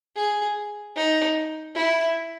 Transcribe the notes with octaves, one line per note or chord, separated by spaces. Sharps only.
G#4
D#4
E4